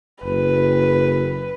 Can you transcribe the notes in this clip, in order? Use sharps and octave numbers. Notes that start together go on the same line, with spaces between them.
F#1 B4